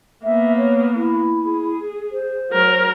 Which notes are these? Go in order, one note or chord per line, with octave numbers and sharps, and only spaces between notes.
A#3 B3 E5
C#5
E4
G#4
C5
F#3 A#4